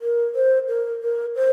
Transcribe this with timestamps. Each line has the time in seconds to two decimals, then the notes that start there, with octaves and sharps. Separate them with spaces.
0.01 A#4
0.35 C5
0.68 A#4
1.02 A#4
1.36 C5